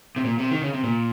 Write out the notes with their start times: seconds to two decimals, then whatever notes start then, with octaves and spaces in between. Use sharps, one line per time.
0.16 C3
0.24 A#2
0.39 C3
0.51 D#3
0.62 C#3
0.73 C3
0.84 A#2